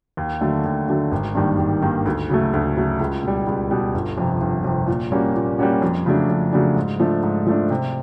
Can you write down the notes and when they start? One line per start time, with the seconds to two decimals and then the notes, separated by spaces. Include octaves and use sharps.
0.17 D#2
0.41 D3 F#3 A3
0.64 D#2
0.88 D3 F#3 A3
1.12 G#1
1.35 G2 D#3 G3 A#3
1.59 G#1
1.82 G2 D#3 G3 A#3
2.06 D2
2.30 C#3 F#3 A3
2.53 D2
2.76 C#3 F#3 A3
2.99 C#2
3.23 B2 G3
3.47 C#2
3.71 B2 G3
3.94 G1
4.18 F2 C3
4.41 G1
4.64 F2 C3
4.87 A#2
5.12 G3 A#3 C#4 F#4
5.36 A#2
5.59 G3 A#3 C#4 F#4
5.82 F2
6.06 C#3 F#3 A3 D4
6.29 F2
6.53 C#3 F#3 A3 D4
6.76 G#2
7.00 F3 A3 D4
7.23 G#2
7.47 F3 A3 D4
7.70 C3